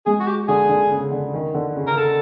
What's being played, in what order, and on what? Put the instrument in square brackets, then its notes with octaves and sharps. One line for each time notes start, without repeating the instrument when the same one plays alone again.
[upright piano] G#3 [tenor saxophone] G#4
[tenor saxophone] F#4
G4
[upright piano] D3 [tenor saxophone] G#4
[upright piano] D3
C#3
D3
D#3
D3
C#3
[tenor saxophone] A#4
A4